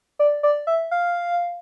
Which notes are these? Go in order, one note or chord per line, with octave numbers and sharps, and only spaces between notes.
D5
D5
E5
F5